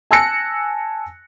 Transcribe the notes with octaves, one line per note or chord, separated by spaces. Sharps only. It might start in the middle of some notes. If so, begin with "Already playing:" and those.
G#5 A5 E6 F#6 A#6 C#7